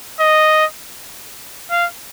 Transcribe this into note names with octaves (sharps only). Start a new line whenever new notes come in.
D#5
F5